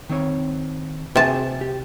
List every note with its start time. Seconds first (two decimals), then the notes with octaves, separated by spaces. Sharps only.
0.09 D#3 C4 C#5
1.16 C3 F#4 G#4 G#5 A5
1.61 G4